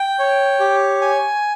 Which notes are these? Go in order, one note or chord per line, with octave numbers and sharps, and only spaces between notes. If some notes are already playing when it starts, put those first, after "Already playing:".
Already playing: G5
C#5
G4
G#5